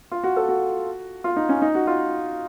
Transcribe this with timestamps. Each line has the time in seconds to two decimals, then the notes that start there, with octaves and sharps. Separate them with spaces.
0.11 F4
0.24 F#4
0.36 A4
0.49 F#4
1.24 F4
1.36 D#4
1.49 C#4
1.62 D#4
1.75 F#4
1.87 F4